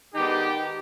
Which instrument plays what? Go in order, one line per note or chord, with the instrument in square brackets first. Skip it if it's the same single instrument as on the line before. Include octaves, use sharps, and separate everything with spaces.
[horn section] D#3 G#3 B3 D4 D#4 G4